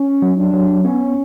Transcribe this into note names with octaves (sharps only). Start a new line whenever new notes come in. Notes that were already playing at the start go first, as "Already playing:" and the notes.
Already playing: C#4
F#3
D4
F#3
B3 C#4